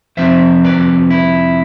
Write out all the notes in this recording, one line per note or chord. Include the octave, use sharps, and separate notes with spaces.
F2 C3 F3 C4 C5 E5
B4 D5
E4